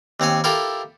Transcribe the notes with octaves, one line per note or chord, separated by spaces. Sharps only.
D#2 C4 C#5 G#5
E4 F4 G4 A4 A#4 F5